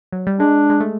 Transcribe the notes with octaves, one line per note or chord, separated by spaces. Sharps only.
F#3
G3
G#3 D4
G#3
A3